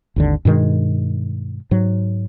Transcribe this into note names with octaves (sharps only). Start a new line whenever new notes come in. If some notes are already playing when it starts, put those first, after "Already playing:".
G#1 D#2 D3
G2 B2 D#3 G#3
G#2 F#3